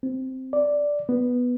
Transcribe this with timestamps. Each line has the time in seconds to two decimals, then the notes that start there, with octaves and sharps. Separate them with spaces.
0.03 C4
0.53 D5
1.09 B3